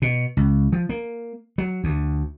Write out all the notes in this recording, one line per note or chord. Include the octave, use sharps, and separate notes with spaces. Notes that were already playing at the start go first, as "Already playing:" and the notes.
B2
C#2
F3
A#3
F#3
D2